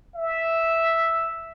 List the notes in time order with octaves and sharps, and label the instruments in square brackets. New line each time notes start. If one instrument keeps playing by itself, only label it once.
[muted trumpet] E5